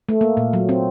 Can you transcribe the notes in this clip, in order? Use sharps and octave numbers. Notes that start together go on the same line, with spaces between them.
A3
A#3
A#2
F#3
C4